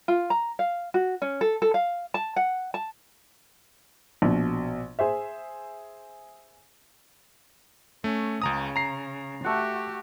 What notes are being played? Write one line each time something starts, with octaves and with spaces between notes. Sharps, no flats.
F4
A#5
F5
F#4
C#4
A4
A4
F5
A5
F#5
A5
A#1 B2
G#4 C5 E5
A3 C#4
C#2 C#3 A#5 D#6
A#5 C7
A3 F#4 G4 F#5